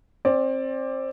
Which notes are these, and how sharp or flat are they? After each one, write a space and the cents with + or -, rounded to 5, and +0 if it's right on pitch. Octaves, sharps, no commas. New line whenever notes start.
C4 +25 D5 +0